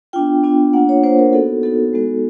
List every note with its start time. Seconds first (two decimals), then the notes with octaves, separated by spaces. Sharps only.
0.13 B3 D4 F4 G5
0.44 B3 D4 F4
0.73 A#3 D4 F4 F#5
0.89 C#5
1.03 A#3 D4 F4 C5
1.19 A#4
1.33 B3 D#4 F#4 A4
1.63 B3 D#4 F#4 A4
1.93 G#3 B3 D#4 F#4